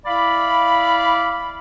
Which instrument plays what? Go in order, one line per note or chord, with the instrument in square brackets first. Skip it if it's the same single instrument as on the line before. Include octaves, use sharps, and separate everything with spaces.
[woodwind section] E4 D5 F5 B5